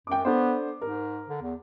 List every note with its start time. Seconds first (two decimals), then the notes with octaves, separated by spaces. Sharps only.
0.07 F#2 G5 D6
0.25 B3 D4 A4 C5
0.81 G#2 A#4
1.28 D3
1.42 E2